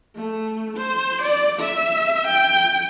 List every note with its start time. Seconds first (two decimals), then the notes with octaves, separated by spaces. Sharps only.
0.15 A3
0.77 C5
1.22 D5
1.60 E5
2.27 G5